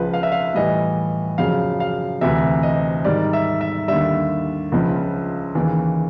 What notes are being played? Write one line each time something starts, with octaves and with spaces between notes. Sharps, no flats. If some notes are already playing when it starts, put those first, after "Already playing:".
Already playing: C#2 C#3 F3 B4
F5
E5
F5
A2 E3 G3 D#5
F#2 C#3 F3 F5
F5
D2 C3 E3 E5
D#5
G#2 D#3 G3 D5
E5
E5
D#2 D3 G3 E5
C#2 C#3 F3
D#2 C#3 E3